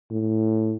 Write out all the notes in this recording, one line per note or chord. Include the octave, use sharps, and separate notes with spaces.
A2